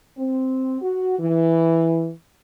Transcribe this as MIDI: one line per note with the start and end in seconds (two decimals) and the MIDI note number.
0.17 0.77 60
0.81 1.15 66
1.18 2.09 52